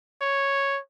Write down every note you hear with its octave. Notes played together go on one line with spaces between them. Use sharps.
C#5